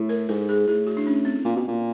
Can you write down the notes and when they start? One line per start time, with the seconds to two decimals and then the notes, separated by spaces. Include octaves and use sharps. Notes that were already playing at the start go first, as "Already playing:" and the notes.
Already playing: A2
0.09 A#4
0.29 G#2 A4
0.49 G#4
0.68 A2 G#4
0.87 F#4
0.97 D4
1.07 C#4
1.25 C4
1.45 A#2
1.56 B2
1.68 A#2